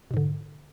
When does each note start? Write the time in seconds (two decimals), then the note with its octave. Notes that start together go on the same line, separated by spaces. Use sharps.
0.11 B2
0.14 G#2
0.17 D3